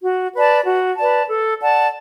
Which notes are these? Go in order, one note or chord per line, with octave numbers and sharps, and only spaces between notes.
F#4
B4 D5 A5
F#4
B4 D5 A5
A4
D5 F#5 A5